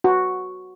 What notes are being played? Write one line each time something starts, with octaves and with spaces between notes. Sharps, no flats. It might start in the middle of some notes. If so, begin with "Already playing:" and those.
F#4